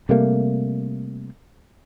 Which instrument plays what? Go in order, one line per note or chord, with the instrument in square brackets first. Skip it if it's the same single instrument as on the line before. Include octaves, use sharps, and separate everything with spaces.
[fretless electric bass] C3 G3 A3 A#3